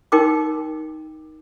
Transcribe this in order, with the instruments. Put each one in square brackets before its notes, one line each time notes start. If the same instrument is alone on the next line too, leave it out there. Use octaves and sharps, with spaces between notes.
[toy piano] D#4 A#4 G5 C6 D6